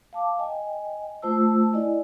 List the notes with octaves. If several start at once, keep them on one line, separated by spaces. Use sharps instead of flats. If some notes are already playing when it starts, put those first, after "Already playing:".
F5 A5 D6
D#5 G5 G#5
A3 F4 C5 A5 E6
E4 D5 D#5 G#5